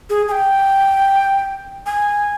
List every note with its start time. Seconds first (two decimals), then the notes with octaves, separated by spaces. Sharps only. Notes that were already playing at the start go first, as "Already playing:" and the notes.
0.10 G#4
0.28 G#5
0.32 G5
1.86 G#5